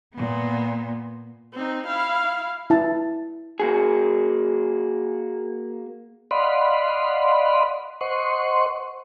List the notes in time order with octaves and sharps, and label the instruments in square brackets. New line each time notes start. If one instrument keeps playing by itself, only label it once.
[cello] A#2 B3
[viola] C4 D#4
E4 F5
[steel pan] E4 A5
[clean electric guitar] A#3 F#4 G#4
[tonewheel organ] D5 D#5 F5 F#5 B5 C6
C5 D#5 F#5 C6 C#6